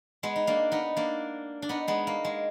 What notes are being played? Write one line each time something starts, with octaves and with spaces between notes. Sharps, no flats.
G#3 B3
D#4
A#3 D4
B3 D#4
A#3 D4
D4
B3 D#4
G#3 B3
A#3
G#3